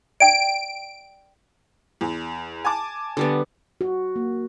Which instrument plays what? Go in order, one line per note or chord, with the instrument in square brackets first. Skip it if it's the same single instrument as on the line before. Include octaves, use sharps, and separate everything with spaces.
[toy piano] D5 G5 [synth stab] D7
[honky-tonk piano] E2
G#5 A5 D6
[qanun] D3 G3 B3
[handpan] F#4
A#3